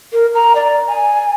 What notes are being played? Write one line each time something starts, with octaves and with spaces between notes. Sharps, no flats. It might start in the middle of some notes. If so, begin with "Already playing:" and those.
A#4
A#5
D5
G#5